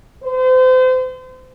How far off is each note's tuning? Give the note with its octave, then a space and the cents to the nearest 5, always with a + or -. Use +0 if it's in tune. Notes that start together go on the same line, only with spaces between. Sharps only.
C5 -35